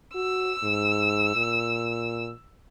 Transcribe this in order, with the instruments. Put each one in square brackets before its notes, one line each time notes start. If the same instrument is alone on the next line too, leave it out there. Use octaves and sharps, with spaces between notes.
[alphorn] F#4 [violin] E6
[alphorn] G#2
A#2